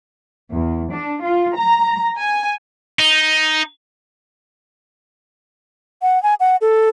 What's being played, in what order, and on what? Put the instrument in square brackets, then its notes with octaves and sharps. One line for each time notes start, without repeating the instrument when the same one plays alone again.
[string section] E2
D4
F4
A#5
G#5
[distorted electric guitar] D#4
[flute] F#5
G#5
F#5
A4